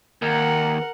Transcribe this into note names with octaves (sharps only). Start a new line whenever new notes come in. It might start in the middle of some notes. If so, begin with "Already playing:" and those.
D#2 A#4 F#5